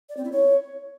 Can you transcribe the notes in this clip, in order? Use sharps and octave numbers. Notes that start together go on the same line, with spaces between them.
D5
C4
E4
C#5